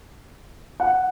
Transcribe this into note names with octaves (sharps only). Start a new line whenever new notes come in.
F#5